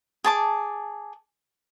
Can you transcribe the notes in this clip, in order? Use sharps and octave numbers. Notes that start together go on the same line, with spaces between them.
G#4 A5 D6